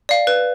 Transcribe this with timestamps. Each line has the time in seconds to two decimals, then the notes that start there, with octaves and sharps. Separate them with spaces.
0.09 D5 F5
0.27 B4